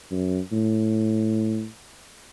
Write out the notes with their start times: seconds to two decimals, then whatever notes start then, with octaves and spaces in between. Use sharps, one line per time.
0.11 F#2
0.52 A2